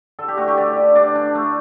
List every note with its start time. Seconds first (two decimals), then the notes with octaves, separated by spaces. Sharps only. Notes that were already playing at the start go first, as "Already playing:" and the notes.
0.19 D3 A4
0.28 G4
0.37 A3 F#4
0.48 G4
0.57 D3 D5
0.77 D3
0.95 D4 D5
1.15 D4
1.35 A3